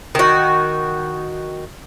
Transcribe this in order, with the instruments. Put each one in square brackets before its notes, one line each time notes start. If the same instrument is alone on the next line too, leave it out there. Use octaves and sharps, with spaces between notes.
[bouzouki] D#3 F#4